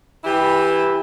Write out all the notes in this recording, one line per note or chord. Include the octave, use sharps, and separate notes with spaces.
E3 E4 G4